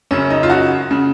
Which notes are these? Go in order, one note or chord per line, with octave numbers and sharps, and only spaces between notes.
F#2 C#3 C#4
D#4
F4
D#4 F#4
C#3